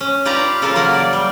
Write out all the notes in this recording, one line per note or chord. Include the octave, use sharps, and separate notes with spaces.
C#4
F4 G4 B4 D5 F5 A#5
C#3 F4 A4 A#4 F5
F#3 A#3 A#4 F#5
D5
G3